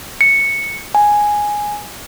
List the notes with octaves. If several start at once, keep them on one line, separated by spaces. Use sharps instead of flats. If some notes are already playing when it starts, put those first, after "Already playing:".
C#7
G#5